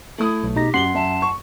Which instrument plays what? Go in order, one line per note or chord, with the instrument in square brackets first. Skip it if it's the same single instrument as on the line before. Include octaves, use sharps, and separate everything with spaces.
[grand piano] A3 D#6 [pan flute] E4
[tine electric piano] B1
[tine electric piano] B2 D#4 A#6 [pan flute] G4
[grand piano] F#2 F#7 G7 [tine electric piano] F#5 C6 C7
[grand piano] F#2 E5 [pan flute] A5
[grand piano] C#6